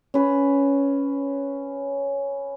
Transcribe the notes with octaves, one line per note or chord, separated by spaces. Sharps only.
C#4 B4